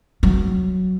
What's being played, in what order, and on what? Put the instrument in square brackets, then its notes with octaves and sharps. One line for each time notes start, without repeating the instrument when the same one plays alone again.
[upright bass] F#3